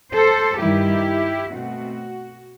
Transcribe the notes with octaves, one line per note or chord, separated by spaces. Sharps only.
A4 C5
G2 D#3 G3 E4 G4
B2 A3 C4 F#4